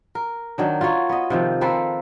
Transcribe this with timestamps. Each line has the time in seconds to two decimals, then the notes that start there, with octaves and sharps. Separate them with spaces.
0.15 A#4
0.58 D#3 F#3 D4
0.81 F4 F#4 A#4 C#5
1.09 B3 D#5
1.30 C3 D#3 F3
1.61 A#3 C4 A4 B4